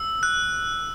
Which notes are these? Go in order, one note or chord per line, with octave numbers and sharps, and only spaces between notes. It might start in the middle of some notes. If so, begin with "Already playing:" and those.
Already playing: E6
F#6